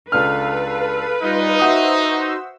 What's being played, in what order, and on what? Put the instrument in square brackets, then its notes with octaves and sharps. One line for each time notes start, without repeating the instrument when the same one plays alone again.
[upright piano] C#2 D4 F6 [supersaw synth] A4 F5 [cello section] B4
[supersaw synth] G3 F4 [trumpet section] D#4
[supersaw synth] F#4 C5 E6 [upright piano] E5 F#5 D#6